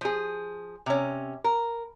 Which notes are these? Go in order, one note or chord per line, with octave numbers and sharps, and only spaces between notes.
F3 G#4
C3 C#4
A#4